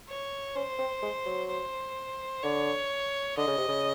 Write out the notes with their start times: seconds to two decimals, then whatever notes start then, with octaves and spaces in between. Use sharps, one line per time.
0.08 C#5
0.55 C#4 C5
0.79 C4
1.02 G#3
1.26 F#3
1.49 C5
2.43 D3 C#5
3.37 D3 D#5
3.47 C#3
3.58 C3
3.68 C#3